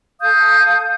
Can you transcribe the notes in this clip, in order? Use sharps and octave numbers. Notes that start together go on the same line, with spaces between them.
A4 F5 D#6 G6